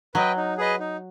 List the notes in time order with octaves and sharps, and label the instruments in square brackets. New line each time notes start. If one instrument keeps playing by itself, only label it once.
[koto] F#3 [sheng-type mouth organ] B4 D#5 G5
[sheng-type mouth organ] D#4
G#4 B4 D#5
D#4